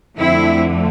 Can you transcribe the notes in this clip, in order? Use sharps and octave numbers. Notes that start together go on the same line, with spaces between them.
F2 D3 A3 C4 E4